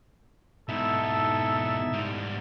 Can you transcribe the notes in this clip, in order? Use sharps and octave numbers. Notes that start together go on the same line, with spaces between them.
G#2 B2 D#4 E4 A4 E5
G#2 G3